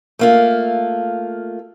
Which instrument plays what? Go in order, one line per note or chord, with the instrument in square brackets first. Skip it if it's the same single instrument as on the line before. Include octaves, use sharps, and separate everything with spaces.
[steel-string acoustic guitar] A3 A#3 F4